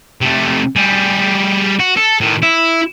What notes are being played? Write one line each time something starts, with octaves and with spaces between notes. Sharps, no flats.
C3 A3
G3 G#4
F#4
A4
A2 D#3
E4